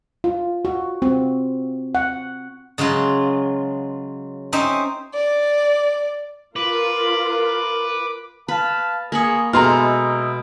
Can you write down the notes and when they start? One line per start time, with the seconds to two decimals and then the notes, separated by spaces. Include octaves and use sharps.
0.24 F4
0.65 F#4
1.02 C4
1.95 F#5
2.78 C#3 F#3 G#3 F4
4.53 C4 C#4 D#4 C5 E5
5.14 D5
6.56 F4 A#4 B4 D6
8.48 B4 F5 A5 B5
9.12 A#3 G#4 B5 C#6
9.53 B2 G#3 D#4 E4 A4 A#5 C6 F6